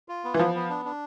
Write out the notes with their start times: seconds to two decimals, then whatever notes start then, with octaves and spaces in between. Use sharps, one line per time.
0.08 F4
0.24 B3
0.34 E3
0.38 F3 B3
0.55 B3
0.70 D4
0.85 D4